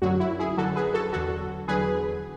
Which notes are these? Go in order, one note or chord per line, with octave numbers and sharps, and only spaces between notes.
F#2 D3 F#3 F#4
E4
E4 G#4
F#2 D3 F#3 F#4 A4
G#4 B4
F#4 A4
E2 D3 F#3 F#4 A4
E2 D3 F#3 G#4 B4